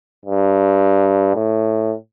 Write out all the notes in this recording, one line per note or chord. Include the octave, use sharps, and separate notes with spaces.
G2
A2